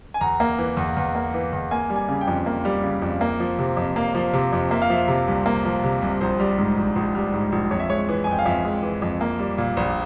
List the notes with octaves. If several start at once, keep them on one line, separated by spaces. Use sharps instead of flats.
G#5
E2 A#5
A#3
E3
E2
E2
A#3
E3
E2
A#3 G#5
G3
G#5
C#3
G5
F2
A#3
G3
C#3
F2
A#3
F3
C3
F2
A#3 F5
F3
C3
F2
A#3 E5
F5
F3 E5
C3
C2
A#3
F3
C3
C2
A#1 C5
G3
G#2
A#1
A#1
G3
G#2
A#1
F2 C#5
E5
G#3 C#5
E3
G#5
F2 G5
F5
F2 E5
G#3
E3
F2
A#3
G3
A#2
A#1